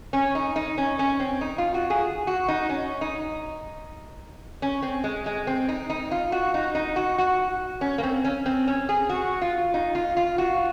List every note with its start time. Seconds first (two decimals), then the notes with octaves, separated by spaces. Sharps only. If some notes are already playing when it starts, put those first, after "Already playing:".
0.13 C#4
0.35 D#4
0.56 D#4
0.78 C#4
0.99 C#4
1.20 C4
1.41 D#4
1.58 F4
1.74 F#4
1.90 G#4
2.27 F#4
2.48 D#4
2.69 C#4
3.01 D#4
4.62 C#4
4.83 C4
5.04 G#3
5.26 G#3
5.47 C4
5.69 D#4
5.90 D#4
6.11 F4
6.32 F#4
6.54 D#4
6.75 D#4
6.96 F#4
7.18 F#4
7.81 C#4
7.98 A#3
8.03 C4
8.24 C#4
8.46 C4
8.68 C#4
8.89 G#4
9.09 F#4
9.42 F4
9.74 D#4
9.95 F4
10.17 F4
10.38 F#4